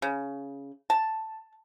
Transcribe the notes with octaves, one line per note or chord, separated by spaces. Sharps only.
C#3
A5